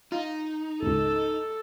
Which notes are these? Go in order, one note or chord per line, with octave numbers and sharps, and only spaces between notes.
D#4 F4
G#1 C#2 A4